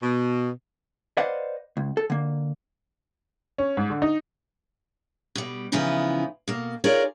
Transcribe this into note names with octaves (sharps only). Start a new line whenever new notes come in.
B2
B4 C5 D5 D#5 F5 F#5
C#2
A4
D3 A#3
C#4
G#2
D3
D#4
B2 G3
C#3 E3 F3 B3 D#4 E4
B2 A#3
D#4 F4 G#4 A#4 C#5 D5